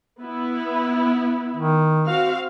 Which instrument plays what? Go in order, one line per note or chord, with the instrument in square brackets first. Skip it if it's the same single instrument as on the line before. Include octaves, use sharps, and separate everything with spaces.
[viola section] B3 E4
[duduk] D#3
[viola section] C4 F#4 F5